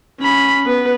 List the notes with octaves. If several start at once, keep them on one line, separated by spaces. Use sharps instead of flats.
C#4 B5
B3 B4